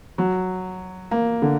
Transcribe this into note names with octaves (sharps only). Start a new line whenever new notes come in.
F#3
A#3
D3